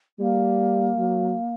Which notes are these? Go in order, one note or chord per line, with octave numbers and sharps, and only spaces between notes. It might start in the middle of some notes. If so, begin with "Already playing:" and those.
G3 A#3
F#3